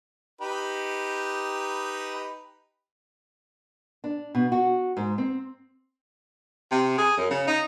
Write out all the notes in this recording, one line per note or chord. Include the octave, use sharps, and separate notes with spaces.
D#4 G4 B4
D4
B2
F#4
G#2
C4
C3
G#4
F#2
C#3
D#4